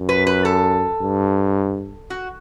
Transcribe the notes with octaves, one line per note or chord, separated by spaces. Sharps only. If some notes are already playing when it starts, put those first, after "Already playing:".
Already playing: F#2
B4
B4
A4
G2
F#4